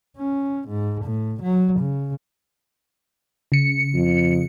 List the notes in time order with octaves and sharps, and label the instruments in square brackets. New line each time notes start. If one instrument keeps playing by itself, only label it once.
[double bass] C#4
G#2
A2
F#3
C#3
[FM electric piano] C#3 C#7
[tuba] F2